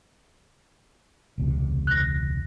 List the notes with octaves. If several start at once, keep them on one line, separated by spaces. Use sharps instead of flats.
E1 C#2 C3
F#6 A#6